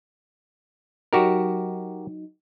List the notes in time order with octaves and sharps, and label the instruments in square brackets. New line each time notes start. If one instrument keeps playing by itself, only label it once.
[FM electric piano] F#3 D#4 [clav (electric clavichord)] F#4 G4 A#4